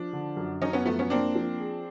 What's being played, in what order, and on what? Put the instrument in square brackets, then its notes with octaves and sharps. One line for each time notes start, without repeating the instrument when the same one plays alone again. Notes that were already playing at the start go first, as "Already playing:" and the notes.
Already playing: [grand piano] F3 [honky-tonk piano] D4
[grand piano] D3
F#2
[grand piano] F#2 [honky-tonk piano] C#4 D#4
[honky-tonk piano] B3 C#4
[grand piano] F3 [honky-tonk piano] A3 B3
[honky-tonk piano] B3 C#4
[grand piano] A#3 [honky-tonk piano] C4 D4
[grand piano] F3
G#4